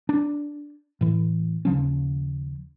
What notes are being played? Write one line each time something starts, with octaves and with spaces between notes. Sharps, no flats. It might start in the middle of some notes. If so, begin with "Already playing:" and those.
D4
A2 E3
D#2 C#3 F3 C#4